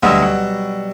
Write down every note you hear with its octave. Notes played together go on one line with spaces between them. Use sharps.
D2 B2 F#3 G3 E6
F#5